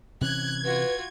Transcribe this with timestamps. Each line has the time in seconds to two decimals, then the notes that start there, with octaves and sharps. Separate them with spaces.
0.21 C3 E3 C#4 F#6 G#6
0.64 F4 F#4 B4